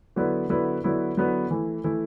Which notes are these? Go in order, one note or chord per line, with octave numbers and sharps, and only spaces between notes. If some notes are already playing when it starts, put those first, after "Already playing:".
D3 F#3 B3 E4 B4
D3 F#3 B3 E4 B4
D3 F#3 B3 E4 B4
D3 F#3 B3 E4 B4
E3 A3 E4
E3 A3 E4